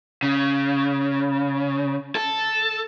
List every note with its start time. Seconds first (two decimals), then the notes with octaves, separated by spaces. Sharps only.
0.23 C#3
2.15 A4